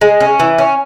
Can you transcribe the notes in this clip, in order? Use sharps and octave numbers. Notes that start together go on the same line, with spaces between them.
G#3
C#4
E3
C#4